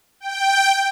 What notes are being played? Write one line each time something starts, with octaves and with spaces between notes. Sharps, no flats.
G5